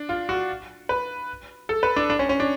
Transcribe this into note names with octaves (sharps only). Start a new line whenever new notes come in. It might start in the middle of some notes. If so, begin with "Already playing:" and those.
Already playing: D4
F4
F#4
B4
A4
B4
D4
D4
C#4
C#4
D4